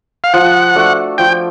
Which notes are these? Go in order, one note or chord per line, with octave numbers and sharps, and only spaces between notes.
F5
F3 F#5
A3 D4 F#4
F3 G5